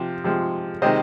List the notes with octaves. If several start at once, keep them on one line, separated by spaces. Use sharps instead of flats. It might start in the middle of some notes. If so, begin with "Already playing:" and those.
Already playing: C3 F3
C3 F3 G#3
C3 D#3 G#3 C5 D#5